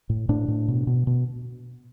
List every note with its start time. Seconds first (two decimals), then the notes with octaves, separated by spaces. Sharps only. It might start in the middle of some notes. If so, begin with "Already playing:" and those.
0.09 A2
0.29 A2 D4
0.48 A2
0.68 B2
0.87 B2
1.07 B2